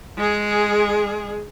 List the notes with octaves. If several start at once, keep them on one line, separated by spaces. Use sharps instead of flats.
G#3 G#4